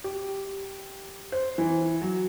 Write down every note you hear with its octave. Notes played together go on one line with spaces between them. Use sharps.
G4
C5
E3
F#3